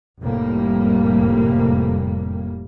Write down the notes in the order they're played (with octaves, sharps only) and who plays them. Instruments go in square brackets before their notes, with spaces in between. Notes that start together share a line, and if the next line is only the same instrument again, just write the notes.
[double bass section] F1 F2 A2 G3 A#3